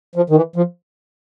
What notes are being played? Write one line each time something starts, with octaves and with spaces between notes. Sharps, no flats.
F3
D#3
E3
F3